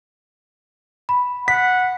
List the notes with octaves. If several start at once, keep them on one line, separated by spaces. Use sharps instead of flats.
B5
F#5 B6